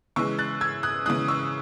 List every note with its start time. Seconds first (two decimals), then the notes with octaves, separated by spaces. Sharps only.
0.16 C#3 E3 G#3 C#6 E6
0.39 F#6 A6
0.61 E6 G#6
0.83 D#6 F#6
1.06 C#3 E3 G#3 D#6 F#6
1.28 C#6 E6